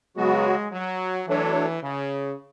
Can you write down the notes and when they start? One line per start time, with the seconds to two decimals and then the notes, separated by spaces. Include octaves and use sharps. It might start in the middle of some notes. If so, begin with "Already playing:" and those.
0.17 C#3 F#3 G#3 B3 F#4
0.72 F#3
1.28 E3 F#3 A3 D4 A4 C#5
1.83 C#3